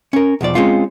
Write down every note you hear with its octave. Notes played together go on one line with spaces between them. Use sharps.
C#4 A#4
B1 E2 F3 D5
G#3 C4 C#4 F4